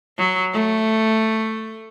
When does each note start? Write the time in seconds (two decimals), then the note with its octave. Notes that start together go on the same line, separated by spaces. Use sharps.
0.18 F#3
0.53 A3